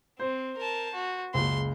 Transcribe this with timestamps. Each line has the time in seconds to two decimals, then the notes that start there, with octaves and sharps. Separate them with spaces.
0.19 C4 C5
0.58 A#4 A5
0.94 F#4
1.34 F#1 C#2 C6